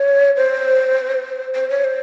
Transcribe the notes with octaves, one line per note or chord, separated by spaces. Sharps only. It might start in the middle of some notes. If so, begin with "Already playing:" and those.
Already playing: C#5
C5
C5
C#5
C5